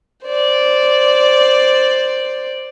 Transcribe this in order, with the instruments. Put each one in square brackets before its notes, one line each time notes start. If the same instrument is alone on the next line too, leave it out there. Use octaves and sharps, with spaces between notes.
[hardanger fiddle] C5 D5